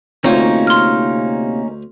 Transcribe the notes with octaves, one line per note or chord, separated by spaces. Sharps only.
D2 C3 A#3 C#4 D#4 F4 C5 C#5
C6 F6